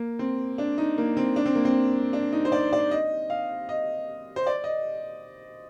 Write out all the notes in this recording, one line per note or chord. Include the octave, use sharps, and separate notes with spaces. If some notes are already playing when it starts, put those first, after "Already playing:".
Already playing: A#3
C4
D4
D#4
A#3
C4
D4
C4
A#3
C4
D4
D#4
C5
D5
D5
D#5
F5
D#5
C5
D5
D#5